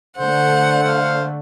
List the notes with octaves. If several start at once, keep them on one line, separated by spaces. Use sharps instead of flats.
D3 A3 C5 F#5
C5 F5